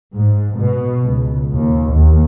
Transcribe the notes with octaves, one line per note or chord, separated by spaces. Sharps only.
G#2
B2
C#2
D#2
D#2